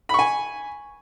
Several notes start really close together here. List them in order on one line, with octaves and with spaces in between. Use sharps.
B5 C#6 G#5